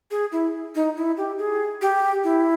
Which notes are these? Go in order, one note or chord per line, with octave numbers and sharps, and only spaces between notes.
G#4
E4
D#4
E4
G4
G#4
G4
E4